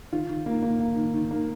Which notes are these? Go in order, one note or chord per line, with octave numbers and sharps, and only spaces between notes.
D#3 F4
D#3
A#3
A#3
A#3
D#3
D#3
A#3